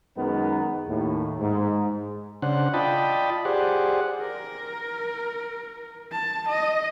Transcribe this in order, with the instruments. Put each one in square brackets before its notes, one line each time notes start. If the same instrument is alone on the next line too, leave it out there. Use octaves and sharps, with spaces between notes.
[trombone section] F#2 D#3 G#3 B3 D#4 A#4
D#2 A2
G#2
[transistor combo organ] C#3 D4 C5 F#5
F4 D5 D#5 G5 A5 B5
G4 G#4 C5 D5 F#5
[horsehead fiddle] A#4
A5
D#5